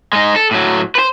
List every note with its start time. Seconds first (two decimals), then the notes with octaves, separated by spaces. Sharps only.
0.13 G#3 D#4
0.36 A4
0.51 A2 F#3
0.95 B4 C5